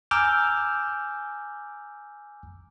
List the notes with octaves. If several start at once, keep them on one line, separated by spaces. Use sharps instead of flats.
G#5 A#5 D6 E6 F6 G6